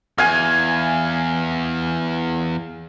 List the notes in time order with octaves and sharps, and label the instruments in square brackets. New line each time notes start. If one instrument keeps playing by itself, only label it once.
[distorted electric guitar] E2 [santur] F5 G#5